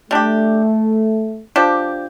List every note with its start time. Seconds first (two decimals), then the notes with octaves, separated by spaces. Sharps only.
0.11 G3 A3 D4 G4
1.56 F3 D4 G4